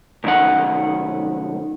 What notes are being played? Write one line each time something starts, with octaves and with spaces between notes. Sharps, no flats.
C2 F#2 D#3 F#5